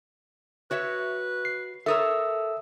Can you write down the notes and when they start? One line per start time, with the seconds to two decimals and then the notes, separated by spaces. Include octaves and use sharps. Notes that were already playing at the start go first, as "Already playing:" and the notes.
0.71 F#4 B4 C#5 E5
1.45 C7
1.86 A4 A#4 C#5 E5 D#6 E6